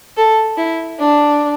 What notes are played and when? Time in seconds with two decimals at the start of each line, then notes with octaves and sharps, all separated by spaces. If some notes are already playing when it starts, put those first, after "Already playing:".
0.17 A4
0.57 E4
1.00 D4